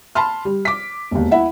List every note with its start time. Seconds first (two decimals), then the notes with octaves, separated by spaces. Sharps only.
0.15 A5 B5 C6 F6
0.45 G3
0.65 D6 B6
1.11 E1 D#2
1.31 E4 E5 F#5